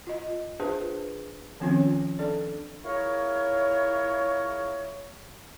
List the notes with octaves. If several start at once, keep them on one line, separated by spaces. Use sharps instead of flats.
F4 D#5
D4 F4 G#4 B4 C5
D#3 F3 C4 C#4 F4 C#5
D4 A4 D5
E4 F4 G#4 A#4 C#5